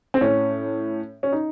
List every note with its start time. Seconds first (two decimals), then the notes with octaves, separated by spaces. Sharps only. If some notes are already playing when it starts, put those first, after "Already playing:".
0.14 C4
0.21 A2 C#4
1.23 C#4
1.32 D#4